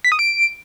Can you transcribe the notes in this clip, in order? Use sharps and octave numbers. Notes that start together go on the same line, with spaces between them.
B6
D#6
D7